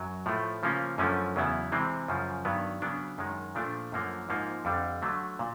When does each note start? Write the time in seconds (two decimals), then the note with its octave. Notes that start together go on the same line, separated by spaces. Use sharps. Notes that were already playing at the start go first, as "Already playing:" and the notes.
Already playing: F#2 F#3
0.26 A2 F3 A3
0.63 C#3 F3 A#3 C#4
0.98 F#2 D3 F3 A3 C#4
1.36 E2 C#3 F#3 B3 E4
1.72 C3 E3 G#3 C4
2.08 F#2 C#3 F3
2.45 G2 D#3 F#3 B3
2.82 C#3 F#3 B3 D4
3.18 F#2 D#3 G#3
3.55 A#2 F3 A3 D4
3.92 F#2 D3 F3 A#3
4.29 G#2 F3 A#3 D#4
4.65 F2 D3 G3
5.02 D3 F#3 A3
5.39 A#2